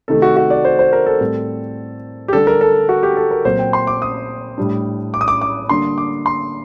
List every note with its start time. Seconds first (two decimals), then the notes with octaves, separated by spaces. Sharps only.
0.08 C3 D#3 A3 A4
0.22 F#4
0.37 F#4
0.50 D5
0.65 C5
0.79 C5
0.93 A#4
1.06 A4
1.21 A2 G3 C4
2.28 G4
2.33 D3 G3 D4 A4
2.47 A#4
2.61 A4
2.89 F#4
3.03 G4
3.17 A4
3.31 A#4
3.45 A#2 F#3 C4 C5
3.59 G5
3.73 C6
3.87 D6
4.02 D#6
4.58 A2 G3 D4
5.14 D6
5.21 D#6
5.28 D6
5.41 D6
5.69 D3 G3 A#3 D4 C6
5.98 D6
6.26 C6